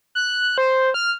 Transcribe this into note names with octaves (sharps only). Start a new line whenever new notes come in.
F#6
C5
F6